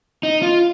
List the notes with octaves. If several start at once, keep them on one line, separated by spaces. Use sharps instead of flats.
D#4
F4